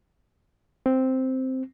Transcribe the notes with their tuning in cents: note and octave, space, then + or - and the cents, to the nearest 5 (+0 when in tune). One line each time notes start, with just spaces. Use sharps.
C4 -5